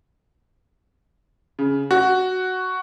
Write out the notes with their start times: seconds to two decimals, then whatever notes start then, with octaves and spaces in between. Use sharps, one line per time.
1.59 C#3
1.91 F#4